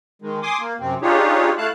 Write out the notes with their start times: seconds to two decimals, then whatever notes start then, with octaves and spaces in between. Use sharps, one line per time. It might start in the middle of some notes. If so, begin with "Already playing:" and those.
0.22 D#3 G#3
0.43 G#5 C6 D6 D#6
0.60 A#3
0.80 F#2 C3 C4
1.02 D4 D#4 F4 G4 G#4 C#5
1.58 A3 E4 F5 A5 F#6